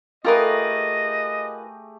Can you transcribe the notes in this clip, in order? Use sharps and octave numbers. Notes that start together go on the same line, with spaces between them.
A3 F4 G4 G#4 A#4 B4 D#5